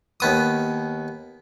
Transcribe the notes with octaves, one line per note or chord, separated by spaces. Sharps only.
D#2 B3 D#6